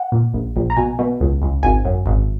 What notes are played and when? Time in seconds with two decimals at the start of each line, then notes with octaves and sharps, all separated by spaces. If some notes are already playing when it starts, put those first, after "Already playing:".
Already playing: F#5
0.12 A#2
0.34 A#1
0.56 A#1
0.70 A#5
0.77 B2 G#5
0.99 B2
1.20 C#2
1.42 C#2
1.63 G#1 G#5
1.85 F#2
2.06 G#1